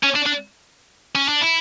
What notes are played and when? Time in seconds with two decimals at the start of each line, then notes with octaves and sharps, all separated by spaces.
0.03 C#4
0.15 D4
0.26 D4
1.15 C#4
1.29 D4
1.41 E4